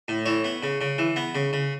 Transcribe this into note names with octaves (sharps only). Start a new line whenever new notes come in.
A2
E3 C#5
B3
C#3
C#3
E3
B3
C#3
C#3